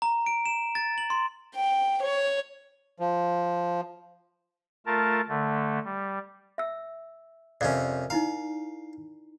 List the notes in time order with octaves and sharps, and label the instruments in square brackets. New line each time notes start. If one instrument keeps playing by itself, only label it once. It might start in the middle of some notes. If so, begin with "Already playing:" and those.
[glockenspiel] A#5
D7
E7
A6
F#7
C6
[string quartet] G5
C#5
[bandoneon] F3
[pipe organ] A3 F4 A#4 A5
D3 A3
G3
[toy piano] E5 E6
[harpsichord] F2 C3 C#4 [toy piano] A#4 D5
[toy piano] D#4 E4 A#5 [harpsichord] F5